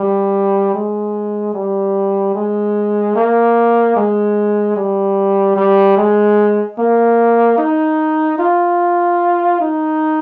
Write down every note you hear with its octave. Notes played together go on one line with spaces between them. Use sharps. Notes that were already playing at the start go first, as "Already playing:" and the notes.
Already playing: G3
G#3
G3
G#3
A#3
G#3
G3
G3
G#3
A#3
D#4
F4
D#4